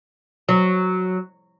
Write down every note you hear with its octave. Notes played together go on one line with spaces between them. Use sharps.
F#3